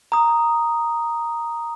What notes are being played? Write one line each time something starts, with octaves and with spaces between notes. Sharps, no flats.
A#5 D#6